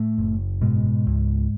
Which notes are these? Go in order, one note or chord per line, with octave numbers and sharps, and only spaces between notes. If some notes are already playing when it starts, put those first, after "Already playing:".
Already playing: A2 A3
F#1
G#2 B2 G#3
C#2